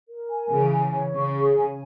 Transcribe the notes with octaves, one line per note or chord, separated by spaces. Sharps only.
A#4
G#5
C#3 E3 G#4
G#5
C#5
C#3 C#6
G#4
G#5